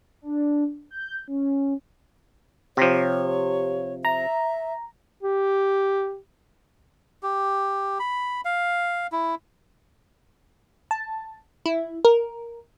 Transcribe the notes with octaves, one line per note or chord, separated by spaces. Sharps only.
D4
G6
C#4
C3 F3 G4 C#5
E5 A#5
G4
G4
B5
F5
E4
A5
E4
A#4